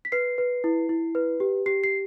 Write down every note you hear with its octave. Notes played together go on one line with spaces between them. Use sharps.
B6
B4 C7
B4
E4
E4
B4
G4
G4 C7
C7